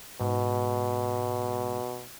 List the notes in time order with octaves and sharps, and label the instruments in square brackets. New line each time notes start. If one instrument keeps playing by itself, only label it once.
[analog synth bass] G#2 [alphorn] B2